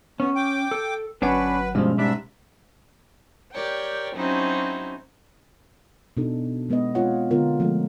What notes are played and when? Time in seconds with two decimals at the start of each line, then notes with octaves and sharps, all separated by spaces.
0.20 B3 C#4
0.35 G5 D6
0.71 A4
1.22 G1 F#3 C#4 D4 B4 C#5 F#5
1.75 G2 B2 F3 G#3 C#4
1.98 G#2 G3 D4 E5
3.51 G4 A#4 C#5 D5 G5
4.15 F#3 C4 C#4 D#4 E4 F#4
6.17 B2 D4 D#4 A4
6.69 D#3 G#3 B3 B4 D#5
6.95 G#3 C4 F4 C#5 F#5
7.31 D3 G#3 B3 F4 A#4
7.60 F3 G#3 A3 A4